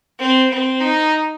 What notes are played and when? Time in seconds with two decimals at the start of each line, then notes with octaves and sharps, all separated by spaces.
0.19 C4
0.50 C4
0.81 D#4